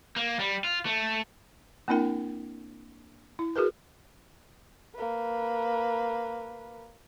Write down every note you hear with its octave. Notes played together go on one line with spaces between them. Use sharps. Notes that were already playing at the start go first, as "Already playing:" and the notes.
A#3
G3
F4
A3
A#3 C4 D4 E4 A#4 G5
E4
F#4 G#4 A#4 B4
A#3 B4